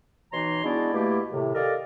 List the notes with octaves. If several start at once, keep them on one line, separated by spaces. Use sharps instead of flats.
B2 E3 D#4 C#5 A#5 C6
G#3 B3 D4 E4 F#4 D5
B2 A3 A#3 E4 G4
A2 C3 D#3
G4 A4 A#4 D5 D#5 F5